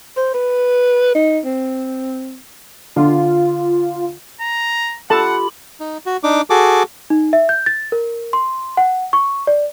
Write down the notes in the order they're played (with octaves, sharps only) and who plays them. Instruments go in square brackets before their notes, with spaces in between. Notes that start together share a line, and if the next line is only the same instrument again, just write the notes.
[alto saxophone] C5
B4
D#4
C4
[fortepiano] D3 [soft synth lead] F4
[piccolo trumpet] A#5
[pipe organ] F4 G4 B5 [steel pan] A4 A5 [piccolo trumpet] F#5
[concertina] D#4
F#4
D4 D#4 D6
F#4 G#4 A4 D6
[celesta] D#4
E5
G6
A6
A#4
C6
F#5
C#6
D5